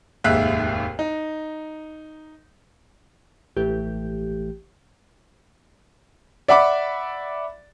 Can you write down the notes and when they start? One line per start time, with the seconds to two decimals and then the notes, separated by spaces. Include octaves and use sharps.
0.24 F1 D#2 G#2 E5 F5 F#6
0.99 D#4
3.57 A1 E3 A3 G4
6.48 D5 E5 F#5 B5 D6